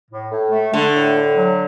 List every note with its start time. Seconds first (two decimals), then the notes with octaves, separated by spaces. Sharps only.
0.10 A2
0.31 A2
0.51 A3
0.72 D3 A3
0.94 A2
1.15 A2
1.36 F#3